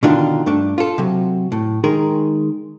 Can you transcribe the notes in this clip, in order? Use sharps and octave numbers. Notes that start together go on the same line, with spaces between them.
B2 D3 D#3 D4 F4
G2 A3 D4
F4 A4
C3 F#3
A2
D#3 G#3 G#4 A#4